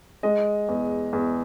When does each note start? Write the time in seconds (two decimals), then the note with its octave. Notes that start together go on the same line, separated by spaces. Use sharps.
0.23 G#3 D#5
0.69 E2
1.13 E2